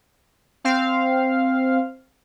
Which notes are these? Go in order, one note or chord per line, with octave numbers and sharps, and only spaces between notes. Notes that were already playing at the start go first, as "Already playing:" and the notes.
C4 F5